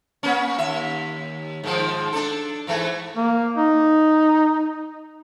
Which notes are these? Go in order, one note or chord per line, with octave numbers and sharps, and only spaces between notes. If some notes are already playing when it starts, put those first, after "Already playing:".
A#3 C#4
D#2 E5
G#2 D#3 F3
D4 A4
G#2 E3 A3
A#3
D#4